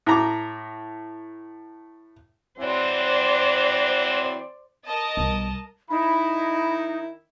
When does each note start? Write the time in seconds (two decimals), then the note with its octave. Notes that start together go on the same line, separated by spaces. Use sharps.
0.06 A2 A#5 D6
2.59 E3 F#3 C4 C5 D5
4.86 A#4 D#5 A5
5.17 B1 G3
5.90 D#3 D#4 E4 B5